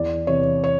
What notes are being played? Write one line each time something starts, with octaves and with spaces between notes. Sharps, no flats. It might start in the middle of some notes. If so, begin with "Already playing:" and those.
Already playing: E2 D5
C3 E3 C#5
C#5